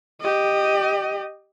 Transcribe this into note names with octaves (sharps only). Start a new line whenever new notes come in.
G4 D#5